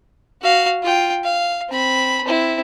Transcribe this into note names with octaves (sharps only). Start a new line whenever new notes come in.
F#4 F5
F4 G5
F5
C4 B5
C4 E4